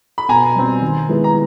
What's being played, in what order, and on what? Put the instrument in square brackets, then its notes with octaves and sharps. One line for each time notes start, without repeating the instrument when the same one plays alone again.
[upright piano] B5
[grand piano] B2 [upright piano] G#5 A#5
[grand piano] G3 C4
D#3
G#3 B3 E4 G#4
[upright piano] A#5